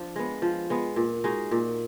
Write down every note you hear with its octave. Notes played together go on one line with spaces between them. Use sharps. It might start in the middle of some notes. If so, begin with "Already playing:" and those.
Already playing: F3 D4 F4
G#3 B3
F3
G#3 B3
A#2
G#3 D#4 F#4
A#2